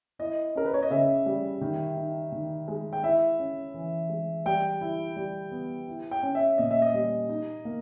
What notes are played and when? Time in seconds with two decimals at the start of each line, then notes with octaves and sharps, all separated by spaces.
0.19 E4 D#5
0.55 C#4 A#4
0.65 B4
0.74 C#5
0.83 D#5
0.90 C#3 E5
1.26 G3
1.61 D#3
1.97 D#4
2.32 D#3
2.68 G#3
2.93 G5
3.04 E4 E5
3.39 C#4
3.74 E3
4.09 G#3
4.45 G3 G5
4.81 E4
5.16 G3
5.52 B3
5.88 E4
6.11 G5
6.23 C#4
6.35 E5
6.58 A#2 D#5
6.71 E5
6.82 D#5
6.94 G3
7.29 D#4
7.65 A#3